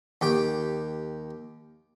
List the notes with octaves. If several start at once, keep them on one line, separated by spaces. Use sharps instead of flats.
D#2 G4 G5